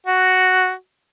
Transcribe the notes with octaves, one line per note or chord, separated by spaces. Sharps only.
F#4